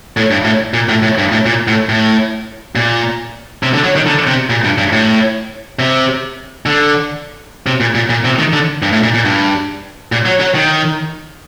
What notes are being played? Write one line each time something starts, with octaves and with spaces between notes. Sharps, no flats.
A2
G2
A2
A#2
A2
A2
G2
A2
A#2
A2
A2
A#2
C3
D3
F#3
D#3
D3
C3
A#2
G2
G2
A2
C3
D3
C3
A#2
A#2
A#2
C3
D#3
D3
G2
A2
A#2
A#2
G2
A#2
F#3
F#3
D#3